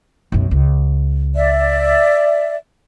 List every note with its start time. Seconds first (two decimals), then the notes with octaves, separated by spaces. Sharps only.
0.32 B1 F#2
0.51 C#2
1.35 D5 E5